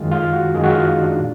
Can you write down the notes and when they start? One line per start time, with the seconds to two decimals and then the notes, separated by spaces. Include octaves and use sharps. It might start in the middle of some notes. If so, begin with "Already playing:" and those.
Already playing: F#2 D#3 G#3 F4
0.11 F4
0.33 F#4
0.55 F#2 D#3 G#3 G#4
0.64 F#4
0.71 F4
0.87 D#4
1.03 D4
1.19 A#2